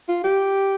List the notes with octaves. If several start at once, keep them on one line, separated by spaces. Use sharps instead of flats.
F4
G4